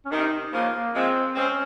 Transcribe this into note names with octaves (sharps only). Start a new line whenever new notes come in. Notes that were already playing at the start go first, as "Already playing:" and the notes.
C#4
C3 D#3 D#4
C#3 F3 A#3
A#3
F3 G#3 C4
G#3 C4 C#4